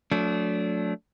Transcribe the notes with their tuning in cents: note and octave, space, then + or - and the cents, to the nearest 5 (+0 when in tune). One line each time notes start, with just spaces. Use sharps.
F#3 -40 A3 +0 D4 -25